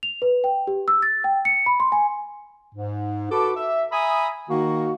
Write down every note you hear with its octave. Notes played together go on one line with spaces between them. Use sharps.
F7
B4
G5
G4
E6
A6
G5
C#7
B5
C6
G#5
G#2
F#4 A4 B4 A5 D6
E5
E5 G#5 A#5 B5 D#6
D#3 A#3 D#4 F#4